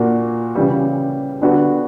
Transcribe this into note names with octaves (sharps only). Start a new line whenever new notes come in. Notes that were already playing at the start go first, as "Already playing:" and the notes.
Already playing: A#2 A#3 D4 F#4
C#3 E3 G3
D3 G3 B3 D4 F#4